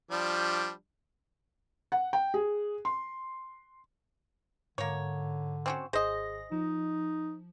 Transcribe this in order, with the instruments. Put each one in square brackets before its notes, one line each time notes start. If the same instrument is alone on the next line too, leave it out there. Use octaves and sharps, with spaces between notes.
[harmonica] F3 G3 D4
[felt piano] F#5
G5
G#4
C6
[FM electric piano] G#2 [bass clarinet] D3 [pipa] A#3 C#5
[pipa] C4 C#4 F#4
[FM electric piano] G#1 G#4 A#6 [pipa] C5 D#5
[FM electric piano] F3 [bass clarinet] D#4